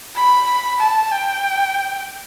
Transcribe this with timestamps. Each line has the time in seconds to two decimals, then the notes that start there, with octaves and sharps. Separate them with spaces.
0.16 B5
0.80 A5
1.12 G5